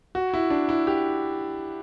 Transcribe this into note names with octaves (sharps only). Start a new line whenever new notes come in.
F#4
E4
D4
E4
G4